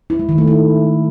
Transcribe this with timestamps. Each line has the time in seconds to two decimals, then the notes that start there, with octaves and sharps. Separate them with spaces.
0.10 E4
0.19 G#3
0.29 D#3
0.38 A3
0.47 E4